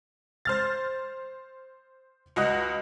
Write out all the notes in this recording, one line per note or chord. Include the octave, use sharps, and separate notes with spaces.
C5 F6 A6
C#2 F#4 D#5 F#6